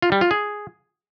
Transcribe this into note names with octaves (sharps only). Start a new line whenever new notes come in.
F4
G3
F4
G#4